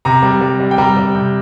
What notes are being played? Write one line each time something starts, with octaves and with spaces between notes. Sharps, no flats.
C3 A#5
G3
G3
G3
G5
G3 A#5
G3
C3